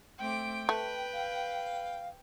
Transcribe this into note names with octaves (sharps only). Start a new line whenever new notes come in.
A3 C4 G5 D6
A3 B4
F5